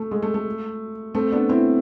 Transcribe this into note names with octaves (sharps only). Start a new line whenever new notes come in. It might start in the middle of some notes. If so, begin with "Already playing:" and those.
Already playing: A3
G#3
A3
A3
A3 C4
B3 D4
C4 E4